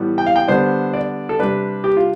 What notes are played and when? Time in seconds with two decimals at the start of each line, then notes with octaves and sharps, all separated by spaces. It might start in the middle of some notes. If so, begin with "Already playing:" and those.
Already playing: A2 E3 G3 B3
0.18 G5
0.27 F5
0.36 G5
0.48 D3 G3 B3 D4 C5
0.93 D5
1.29 A4
1.39 C3 G3 D4 B4
1.84 G4
1.97 F4